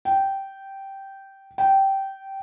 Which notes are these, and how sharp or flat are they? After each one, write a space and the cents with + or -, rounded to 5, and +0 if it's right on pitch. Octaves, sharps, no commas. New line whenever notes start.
G5 -10
G5 -15